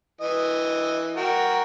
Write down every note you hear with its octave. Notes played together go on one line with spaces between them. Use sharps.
E3 D#5
F#4 A#4 G5